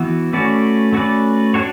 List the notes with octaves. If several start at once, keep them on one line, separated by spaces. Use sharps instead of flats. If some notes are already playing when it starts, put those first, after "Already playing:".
Already playing: E3 B3 F#4
A3 C#4 F#4 B4 D5
A3 C#4 F#4 B4 D5
D4 F#4 C#5